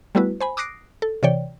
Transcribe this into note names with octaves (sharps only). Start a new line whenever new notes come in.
G3 A3 B3 E4 F#4 B4
C5 G#5 B5
D6 D#6 F#6 A#6 C7 D7
A4
C3 E3 C#5 D5 G5